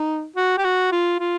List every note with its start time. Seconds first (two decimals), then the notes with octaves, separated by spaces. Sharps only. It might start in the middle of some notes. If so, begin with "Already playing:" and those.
Already playing: D#4
0.36 F#4
0.58 G4
0.64 F#4
0.92 F4
1.20 F4